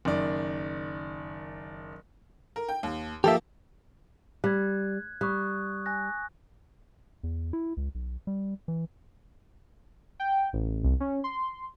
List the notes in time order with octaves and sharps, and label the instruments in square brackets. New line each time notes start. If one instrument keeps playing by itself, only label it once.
[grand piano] F#1 D#3 D5
[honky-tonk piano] A#4
G5
D#2
[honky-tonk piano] F3 A#3 [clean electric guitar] G4 A4 E5
[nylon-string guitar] G3 [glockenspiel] F#6 G#6
[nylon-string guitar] G3 [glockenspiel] C#6 D#6 F#6
[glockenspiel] G#5 F#6 A#6
[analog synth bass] E2
E4
C#2
B1
G3
E3
[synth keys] G5
A1
C2
C#4
C6